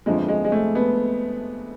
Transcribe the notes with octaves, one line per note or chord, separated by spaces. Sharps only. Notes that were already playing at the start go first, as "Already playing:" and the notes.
G1 F2 D3 F3 G#3
G#3
G#3
A3
B3